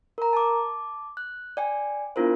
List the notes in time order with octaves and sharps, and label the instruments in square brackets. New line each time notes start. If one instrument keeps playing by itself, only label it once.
[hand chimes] A#4 A#5
A5 D6
F#6
D5 G5 G#5
B3 D4 E4 F4 A#4 C5